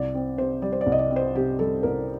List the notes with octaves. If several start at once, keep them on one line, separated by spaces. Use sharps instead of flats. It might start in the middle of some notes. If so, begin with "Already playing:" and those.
Already playing: C2 D5
C4
C3 C5
G3 D5
C5
D5
C2
D#5
D5
C4
C5
C3 G4
G3 A4
C2 A#4